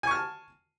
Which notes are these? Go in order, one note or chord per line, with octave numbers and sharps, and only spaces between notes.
G#5 A5 C#6 F6